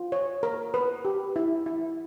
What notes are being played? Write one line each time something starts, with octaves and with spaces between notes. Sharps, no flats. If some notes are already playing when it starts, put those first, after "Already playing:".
Already playing: F4
C#5
A#4
B4
G4
E4
E4